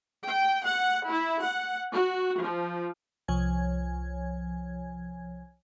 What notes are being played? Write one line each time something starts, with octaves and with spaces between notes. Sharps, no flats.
G5
F#5
E4
F#5
F#4
F3
C2 F3 C#5 G#5 G#6